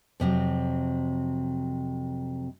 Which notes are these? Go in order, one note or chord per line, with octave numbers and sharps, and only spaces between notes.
F2 C3 E3 F#3